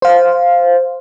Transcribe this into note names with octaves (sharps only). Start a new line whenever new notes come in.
C5 F5